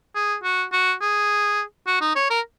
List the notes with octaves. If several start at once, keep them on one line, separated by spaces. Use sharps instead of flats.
G#4
F#4
F#4
G#4
F#4
D#4
C#5
A#4